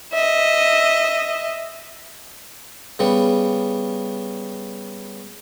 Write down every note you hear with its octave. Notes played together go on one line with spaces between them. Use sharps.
D#5 E5
C#3 G3 B3